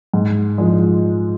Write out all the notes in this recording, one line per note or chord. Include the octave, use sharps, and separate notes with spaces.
G#2
F3 G#3